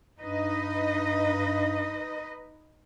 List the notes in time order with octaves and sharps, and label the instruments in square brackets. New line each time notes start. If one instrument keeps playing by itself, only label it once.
[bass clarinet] G2 [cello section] D#4 B4 D#5